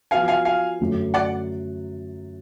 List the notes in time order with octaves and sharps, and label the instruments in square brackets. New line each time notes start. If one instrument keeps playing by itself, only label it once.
[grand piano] F3 B3 F#4 B4 [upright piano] F5 G#5
[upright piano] F5 G#5
F5 G#5
[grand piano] F#2 D3 F#3 A3
[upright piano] D5 F#5